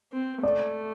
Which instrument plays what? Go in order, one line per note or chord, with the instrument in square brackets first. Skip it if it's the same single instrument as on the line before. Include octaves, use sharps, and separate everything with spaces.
[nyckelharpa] C4
[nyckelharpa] A3 [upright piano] D5